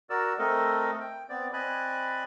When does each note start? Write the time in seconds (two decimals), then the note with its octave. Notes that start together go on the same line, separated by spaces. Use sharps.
0.10 F#4 A#4 D5 E6
0.39 A3 C4 A4 A#4 D#5
1.00 G5
1.29 B3 C4 D5
1.53 C4 D5 D#5 G#5 B5 F#6